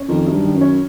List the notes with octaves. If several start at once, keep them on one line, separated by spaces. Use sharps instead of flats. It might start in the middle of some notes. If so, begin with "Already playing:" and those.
Already playing: C#4
F2 D#3
F#2
G2
D#3
F#2
C#4